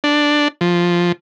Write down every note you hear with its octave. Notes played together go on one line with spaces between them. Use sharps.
D4
F3